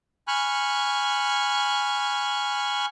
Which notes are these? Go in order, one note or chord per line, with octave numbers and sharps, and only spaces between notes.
G#5 B5 C#6 F6 F#6